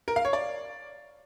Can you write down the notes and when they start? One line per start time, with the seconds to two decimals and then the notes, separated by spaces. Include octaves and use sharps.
0.08 A#4
0.16 F5
0.25 C#5
0.33 D5